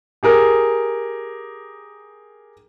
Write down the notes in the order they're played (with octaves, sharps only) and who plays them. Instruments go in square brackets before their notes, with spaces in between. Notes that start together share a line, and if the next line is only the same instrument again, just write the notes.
[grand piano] G4 G#4 A#4